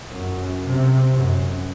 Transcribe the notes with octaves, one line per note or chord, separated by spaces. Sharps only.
F#2
C3
F#2